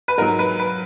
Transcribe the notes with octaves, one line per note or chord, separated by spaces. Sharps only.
B4
G#2 F#3 A#4
B4
B4